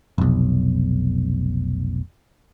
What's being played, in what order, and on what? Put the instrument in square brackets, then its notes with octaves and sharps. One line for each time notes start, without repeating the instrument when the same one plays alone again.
[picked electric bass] F1 B1